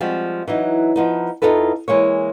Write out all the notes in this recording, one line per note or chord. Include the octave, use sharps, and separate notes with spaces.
F3 G3 G#3 C4 F#4
E3 F#3 D#4
F3 B3 D#4
E2 F3 D#4 F4 A4 B4
E3 G#3 A#3 C#5